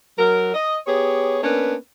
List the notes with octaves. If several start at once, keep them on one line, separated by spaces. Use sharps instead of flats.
F#3 A#4
D#5
B3 G4 G#4 C#5
A#3 B3 C#4 D4 A#4 B4